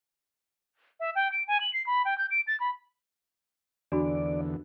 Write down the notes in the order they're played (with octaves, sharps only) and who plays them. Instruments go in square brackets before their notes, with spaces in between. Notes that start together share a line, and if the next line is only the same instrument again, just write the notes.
[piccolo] E5
G5
D7
G#5
F#7
C7
B5
G5
G6
D7
A6
B5
[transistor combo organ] E2 D3 [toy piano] D4 F#4 B5 [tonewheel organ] D5